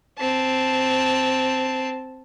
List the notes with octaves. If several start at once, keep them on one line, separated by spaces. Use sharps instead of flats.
C4 A5